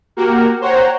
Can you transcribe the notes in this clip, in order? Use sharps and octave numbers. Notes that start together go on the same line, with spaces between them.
A#3 F#4 G4 A#4
C5 C#5 F#5 G5 A#5